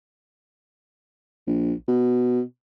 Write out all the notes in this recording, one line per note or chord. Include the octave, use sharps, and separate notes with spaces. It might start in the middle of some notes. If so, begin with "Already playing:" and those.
A#1
B2